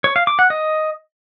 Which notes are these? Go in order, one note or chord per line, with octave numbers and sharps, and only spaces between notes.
C#5
F5
D6
F#5
D#5